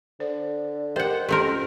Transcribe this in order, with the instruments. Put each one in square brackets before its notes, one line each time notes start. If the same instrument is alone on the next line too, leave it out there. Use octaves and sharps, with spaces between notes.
[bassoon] D3 [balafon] C5
[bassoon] G4 [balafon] A#4 [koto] C5 F#5 [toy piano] D#5
[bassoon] F2 [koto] A3 C4 A#4 [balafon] C#4 [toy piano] G4 C5 C6